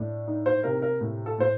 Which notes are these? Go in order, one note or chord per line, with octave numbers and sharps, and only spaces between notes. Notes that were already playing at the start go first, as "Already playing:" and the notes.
Already playing: A2 D4
D#4
C5
C3 A#4
A#4
A2
A4
A2 C5